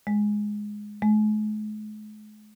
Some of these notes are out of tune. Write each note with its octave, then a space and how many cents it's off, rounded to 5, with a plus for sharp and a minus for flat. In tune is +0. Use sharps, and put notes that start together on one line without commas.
G#3 +5
G#3 +45